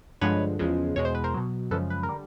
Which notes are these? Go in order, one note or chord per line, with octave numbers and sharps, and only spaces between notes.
G2 D3 F3 G#3 B4 C#5
E2 C#3 F3 G#3
E2 B2 G#3 C#5
C5
B4
A#4 C5
B2 F#3
F#2 C#3 F3 G#3 A4 B4
B4
A#4
D3 G3